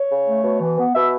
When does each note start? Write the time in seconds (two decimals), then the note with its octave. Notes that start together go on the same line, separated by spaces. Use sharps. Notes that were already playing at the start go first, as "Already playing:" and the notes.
Already playing: C#5
0.09 C#3
0.27 A3
0.44 B2
0.60 E3
0.78 B3
0.94 B2 E5